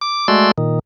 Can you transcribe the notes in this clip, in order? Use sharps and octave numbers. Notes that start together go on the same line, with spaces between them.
D6
G#3 A3 F#4 D5 C6 E6
A#2 D#3